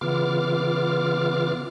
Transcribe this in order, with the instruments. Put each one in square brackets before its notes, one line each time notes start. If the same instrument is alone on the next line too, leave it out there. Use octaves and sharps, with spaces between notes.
[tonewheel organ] C#3 E3 B3 F4 D6 F6